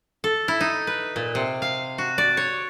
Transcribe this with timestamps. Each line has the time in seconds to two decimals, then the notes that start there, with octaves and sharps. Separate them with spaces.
0.24 A4
0.48 E4
0.61 D#4
0.87 B4
1.16 A#2
1.35 C3
1.62 F5
1.98 F#4
2.18 D5
2.37 C#5